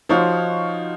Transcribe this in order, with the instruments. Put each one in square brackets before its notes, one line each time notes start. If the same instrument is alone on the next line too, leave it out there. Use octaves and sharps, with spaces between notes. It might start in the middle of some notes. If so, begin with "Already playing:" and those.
[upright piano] F3 [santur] D#4 F#4 C#5 F5